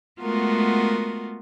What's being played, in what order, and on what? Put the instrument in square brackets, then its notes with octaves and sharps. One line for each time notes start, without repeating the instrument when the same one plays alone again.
[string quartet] G#3 A3 B3 F4 F#4 A#4